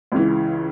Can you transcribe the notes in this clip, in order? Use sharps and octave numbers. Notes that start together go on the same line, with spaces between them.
C#2 C#3 E3